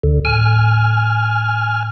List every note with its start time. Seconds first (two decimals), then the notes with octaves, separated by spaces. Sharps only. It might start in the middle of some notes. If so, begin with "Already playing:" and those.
0.03 D2 D3
0.25 A2 G#5 F6